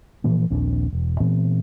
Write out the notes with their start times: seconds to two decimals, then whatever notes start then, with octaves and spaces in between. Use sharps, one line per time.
0.24 A#2 E3 F3 A#3
0.50 A#1 D#2 C4 D4
0.93 E1
1.20 A#2 E3 B3 C4